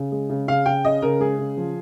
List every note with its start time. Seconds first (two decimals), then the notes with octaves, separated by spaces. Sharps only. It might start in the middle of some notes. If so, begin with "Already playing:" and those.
Already playing: C#3
0.12 G#3
0.30 C#3
0.48 C#3 F5
0.66 C#3 G5
0.84 C#3 D#5
1.02 C#3 A#4
1.20 G#3 G#4
1.38 C#3
1.57 F3